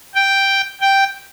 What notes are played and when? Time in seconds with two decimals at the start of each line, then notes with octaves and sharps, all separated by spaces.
0.15 G5
0.81 G5